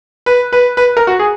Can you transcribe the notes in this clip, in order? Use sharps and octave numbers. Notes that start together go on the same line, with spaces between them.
B4
B4
B4
A#4
F#4
G#4